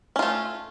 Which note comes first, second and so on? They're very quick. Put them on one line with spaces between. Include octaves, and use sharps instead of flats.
C#4 F4 A3